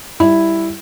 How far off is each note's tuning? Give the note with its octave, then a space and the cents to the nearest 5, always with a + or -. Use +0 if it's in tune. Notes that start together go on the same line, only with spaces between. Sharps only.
G3 +0 E4 +0